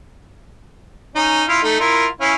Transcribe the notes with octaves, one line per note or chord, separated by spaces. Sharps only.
C#4 D#4
E4 F4 F5
A3 D#4
E4 F4 A#4
C#4 E4 F5